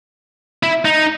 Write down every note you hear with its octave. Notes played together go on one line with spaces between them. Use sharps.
E4
D#4